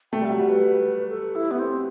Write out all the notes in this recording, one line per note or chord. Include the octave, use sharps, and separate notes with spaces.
A3 G5
G3 E5
F#3
G3 F#5
B4
A4
E4
B3
C4